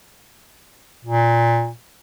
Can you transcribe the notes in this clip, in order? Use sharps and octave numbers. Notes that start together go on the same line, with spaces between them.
A#2